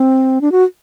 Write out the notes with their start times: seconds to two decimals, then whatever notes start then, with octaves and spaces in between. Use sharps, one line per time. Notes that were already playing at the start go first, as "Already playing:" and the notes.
Already playing: C4
0.41 D4
0.52 F#4